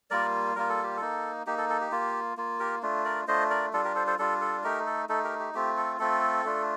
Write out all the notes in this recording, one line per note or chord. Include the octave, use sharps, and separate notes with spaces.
G3 A#3 F4 A#4 D5
G3 A#3 F4 A#4
A4
G4
A#3 D#4 A4
A#3 D#4 G4
A4
A4
G4
A#3 F4
A#3 F4
G4 A#4
A3 D4 F4
A#4 D5
A3 D4 F4 C5 D#5
A#4 D5
G3 D4 F4 A4
G4 A#4
A4 C5
A4 C5
G3 D4 F4 A4
A4
A3 D#4 G4 A#4
A4
A3 D#4 A4
G4 A#4
G4
A3 C4 F4 G4
A4
A3 C4 F4 A4
A3 D4 F4